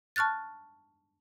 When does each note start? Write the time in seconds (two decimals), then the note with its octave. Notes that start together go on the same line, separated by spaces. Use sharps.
0.16 A5 C#6 F6 F#6 A6